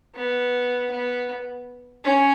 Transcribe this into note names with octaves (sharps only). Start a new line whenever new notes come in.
B3
B3
C#4